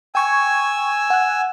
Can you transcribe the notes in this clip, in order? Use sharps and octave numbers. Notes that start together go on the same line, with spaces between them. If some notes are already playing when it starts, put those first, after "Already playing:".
G5 G#5 C#6 E6 G#6
F#5 F#6